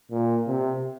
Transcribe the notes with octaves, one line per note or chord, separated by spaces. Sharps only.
A#2
C3